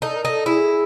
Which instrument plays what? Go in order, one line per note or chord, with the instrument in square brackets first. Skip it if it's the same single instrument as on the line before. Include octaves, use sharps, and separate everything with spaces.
[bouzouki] D#4 [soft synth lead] A4
[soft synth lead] A#4
[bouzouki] D#4 [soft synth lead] A4
[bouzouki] E4 [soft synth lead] G#4